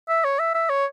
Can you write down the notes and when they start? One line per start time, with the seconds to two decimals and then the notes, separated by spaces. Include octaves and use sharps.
0.09 E5
0.24 C#5
0.39 E5
0.54 E5
0.70 C#5